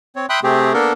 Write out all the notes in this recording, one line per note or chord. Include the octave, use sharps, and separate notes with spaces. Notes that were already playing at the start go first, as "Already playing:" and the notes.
C4 C#5
E5 G5 B5 C6 D#6 F#6
C3 A3 C4 G4 G#4
A#3 B3 D4 A4 A#4